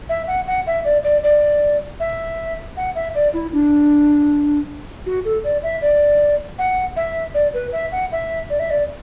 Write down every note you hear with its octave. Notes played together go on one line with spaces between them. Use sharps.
E5
F#5
F#5
E5
D5
D5
D5
E5
F#5
E5
D5
E4
D4
F#4
A4
D5
E5
D5
F#5
E5
D5
B4
E5
F#5
E5
D5
E5
D5